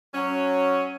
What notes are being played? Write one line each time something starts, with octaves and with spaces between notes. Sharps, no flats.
F#3 C#4